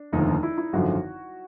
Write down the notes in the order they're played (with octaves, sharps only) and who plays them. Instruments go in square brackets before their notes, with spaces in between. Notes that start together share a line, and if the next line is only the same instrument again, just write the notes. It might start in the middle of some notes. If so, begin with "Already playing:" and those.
Already playing: [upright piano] D4
[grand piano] F1 D#2 D3 F3 [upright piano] D#4
[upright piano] D#4
E4
E4
[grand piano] G#1 F#2 D3 F3 [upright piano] F#4